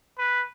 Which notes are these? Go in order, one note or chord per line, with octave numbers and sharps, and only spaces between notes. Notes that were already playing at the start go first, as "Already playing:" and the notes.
B4